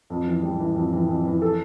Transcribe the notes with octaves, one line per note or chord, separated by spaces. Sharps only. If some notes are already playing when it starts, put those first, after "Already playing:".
F2
E3
G3
E3
F2
E3
F2
E3
A4